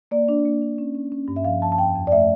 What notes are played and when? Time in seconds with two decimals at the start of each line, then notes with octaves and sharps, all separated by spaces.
0.11 A#3 D5
0.29 D4
0.45 A#3
0.62 D4
0.78 C#4
0.95 C#4
1.12 C#4
1.28 G2
1.36 E5
1.44 F3 F5
1.62 F3 A5
1.72 A5
1.78 F2 G5
1.95 F2
2.07 D5
2.12 A3 E5